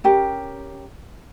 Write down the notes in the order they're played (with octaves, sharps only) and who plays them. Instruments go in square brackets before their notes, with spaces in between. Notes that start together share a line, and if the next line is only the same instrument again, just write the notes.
[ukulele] C#4 G4 A#4